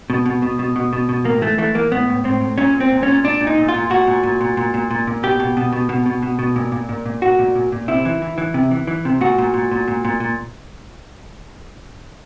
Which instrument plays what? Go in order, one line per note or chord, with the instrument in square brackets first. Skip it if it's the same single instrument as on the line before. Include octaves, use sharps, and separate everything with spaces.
[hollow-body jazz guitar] B2
B2
B2
B2
B2
B2
B2
A2 A#3
E3 A3
E3 A3
E3 A#3
A2 B3
A2
A2 C4
A2
A#2 C#4
A#2
C4
A#2
C#4
A#2
A#2 D4
A#2
D#4
A#2
F4
A#2
A#2 F#4
A#2
A#2
A#2
A#2
A#2
A#2
A#2
B2 G4
B2
B2
B2
B2
B2
B2
B2
A#2
A#2
A#2
A#2
A#2 F#4
A#2
A#2
A#2
C3 E4
E3
E3
E3
C3
E3
E3
C3
A#2 F#4
A#2
A#2
A#2
A#2
A#2
A#2